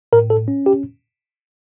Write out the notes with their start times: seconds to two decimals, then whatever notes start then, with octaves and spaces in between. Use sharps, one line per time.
0.13 A2 A#4
0.30 A4
0.48 C#4
0.66 G4